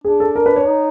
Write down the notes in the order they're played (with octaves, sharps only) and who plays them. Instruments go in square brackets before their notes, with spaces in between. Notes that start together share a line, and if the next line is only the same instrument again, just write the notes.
[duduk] D4 [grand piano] G#4
[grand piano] A4
A#4
B4
C#5
[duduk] D#4